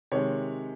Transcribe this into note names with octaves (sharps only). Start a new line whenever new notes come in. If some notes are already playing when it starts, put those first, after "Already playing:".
C3 D#3 G#3 C#5